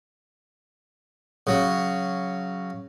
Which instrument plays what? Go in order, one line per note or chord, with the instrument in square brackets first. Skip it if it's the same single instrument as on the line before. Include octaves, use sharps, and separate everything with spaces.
[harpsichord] C#3 F#3